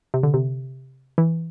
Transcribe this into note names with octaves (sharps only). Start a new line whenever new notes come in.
C3
D3
C3
E3